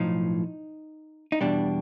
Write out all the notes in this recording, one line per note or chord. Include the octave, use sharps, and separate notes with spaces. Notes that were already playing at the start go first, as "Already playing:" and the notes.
Already playing: B1 A2 F3 D#4
D#4
E2 B2 G3 D4